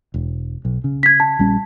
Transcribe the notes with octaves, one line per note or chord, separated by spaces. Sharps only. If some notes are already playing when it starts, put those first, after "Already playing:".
E1
B1
C#3
G#6 B6
A5
A#1 G3 C#4